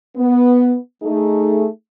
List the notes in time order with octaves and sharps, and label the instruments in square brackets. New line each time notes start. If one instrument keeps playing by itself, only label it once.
[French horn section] B3
A3 D#4 G#4